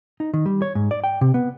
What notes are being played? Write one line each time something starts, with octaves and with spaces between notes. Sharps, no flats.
D#4
D#3
G3
C#5
G#2
D5
G5
C3
B3